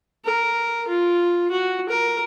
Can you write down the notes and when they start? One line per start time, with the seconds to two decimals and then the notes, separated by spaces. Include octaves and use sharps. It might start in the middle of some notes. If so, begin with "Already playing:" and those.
0.25 A#4
0.88 F4
1.51 F#4
1.89 A#4